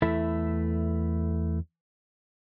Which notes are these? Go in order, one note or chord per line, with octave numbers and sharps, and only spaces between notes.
E2 A3 E4 A4 E5